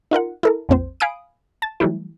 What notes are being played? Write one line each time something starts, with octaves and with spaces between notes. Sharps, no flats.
D#4 F4 A#4 F#5
E4 A4 A#4
A#1 F2 C4 C5
F5 G#5 B5 D#6 D7
A5 A6
E3 F#3 G3 A3 E4